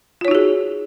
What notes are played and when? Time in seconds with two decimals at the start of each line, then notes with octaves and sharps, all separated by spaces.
0.21 F4
0.25 C#5
0.28 D#4
0.31 F#4
0.35 G#4